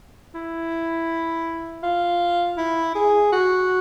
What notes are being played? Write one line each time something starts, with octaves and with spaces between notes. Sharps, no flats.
E4
F4
E4
G#4
F#4